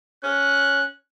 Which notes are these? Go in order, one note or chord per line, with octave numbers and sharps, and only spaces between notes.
C#4 F#6